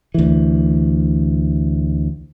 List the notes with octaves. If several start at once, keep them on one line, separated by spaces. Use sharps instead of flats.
D2 E3